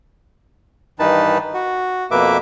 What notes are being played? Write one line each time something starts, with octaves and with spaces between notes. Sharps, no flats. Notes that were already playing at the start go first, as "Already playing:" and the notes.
G2 D#3 E3 D#4 B4 A5
F#4
F2 B2 A#3 B4 E5 D6